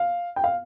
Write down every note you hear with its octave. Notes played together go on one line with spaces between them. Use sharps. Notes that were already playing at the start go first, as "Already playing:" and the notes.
Already playing: F5
G5
F5